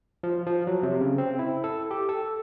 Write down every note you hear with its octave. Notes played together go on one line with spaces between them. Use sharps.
F3
F3
F#3
C3
C#3
C4
E4
A4
G4
A4